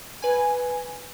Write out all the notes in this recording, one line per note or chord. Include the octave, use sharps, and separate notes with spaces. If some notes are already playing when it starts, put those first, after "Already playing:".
B4 G#5